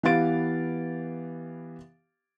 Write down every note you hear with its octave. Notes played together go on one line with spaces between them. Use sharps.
E3 B3 G4 F5 A6 D7